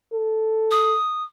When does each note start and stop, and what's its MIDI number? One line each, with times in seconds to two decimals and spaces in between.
0.14 0.96 69
0.71 1.24 87